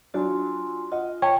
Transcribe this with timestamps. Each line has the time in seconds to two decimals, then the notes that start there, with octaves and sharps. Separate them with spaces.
0.14 F#3 D4 F4 F#4 G#5 C6
0.92 F4 D#5 F#5
1.22 C#5 G5 A5